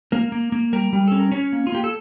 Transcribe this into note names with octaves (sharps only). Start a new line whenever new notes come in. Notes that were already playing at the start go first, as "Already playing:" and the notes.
A#3 A#4
A#3
A#3
G3 A#4
G3
C#4 A4
A#4
C#4 C#5
A#3
F4
A#3 G4
A4